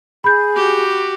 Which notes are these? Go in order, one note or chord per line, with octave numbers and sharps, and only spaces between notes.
G#4 B5 G6
F#4 G4